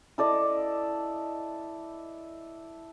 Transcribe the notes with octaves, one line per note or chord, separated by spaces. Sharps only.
E4 A4 D5 D#5